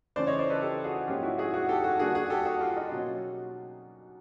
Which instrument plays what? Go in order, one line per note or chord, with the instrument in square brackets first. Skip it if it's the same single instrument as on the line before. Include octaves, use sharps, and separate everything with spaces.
[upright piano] C#3 E3 A3 C#4 C5 D5
C#5 D#5
C5 D5
A4 B4
G4 A4
F#4 G#4
G#2 F3 A#3 C#4 F4 G4
E4 F#4
F#4 G#4
F#4 G#4
G4 A4
F#4 G#4
D3 G3 A#3 F#4 G#4
F#4 G#4
G4 A4
F#4 G#4
F4 G4
D#4 F4
B2 F#3 A#3 C#4